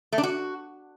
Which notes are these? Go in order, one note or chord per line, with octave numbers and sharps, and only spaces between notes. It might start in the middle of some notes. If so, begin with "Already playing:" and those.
A3
D4
F#4